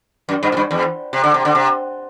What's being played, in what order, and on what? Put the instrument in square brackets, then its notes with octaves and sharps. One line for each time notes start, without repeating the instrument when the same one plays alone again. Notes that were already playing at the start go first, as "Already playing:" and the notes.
[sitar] F#2
G2
A2
G2
E2
C3
D3
C3
D3
C3